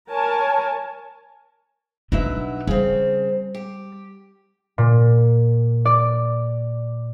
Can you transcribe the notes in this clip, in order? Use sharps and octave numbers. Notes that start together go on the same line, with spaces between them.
A#4 C#5 G#5 A5
B2 F#3 D4 D#4 E5
C#3 G3 C4
G4
A#2
D5